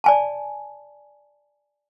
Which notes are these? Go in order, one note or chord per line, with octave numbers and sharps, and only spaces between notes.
D5 G#5 A5